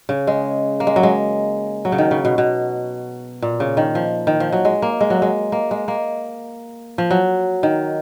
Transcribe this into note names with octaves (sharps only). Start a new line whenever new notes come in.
C#3
G#3
A#3
G#3
F#3
G#3
F#3
C#3
D#3
C#3
B2
B2
A#2
C#3
D#3
F3
D#3
F3
F#3
G#3
A#3
G#3
F#3
G#3
A#3
G#3
A#3
F3
F#3
D#3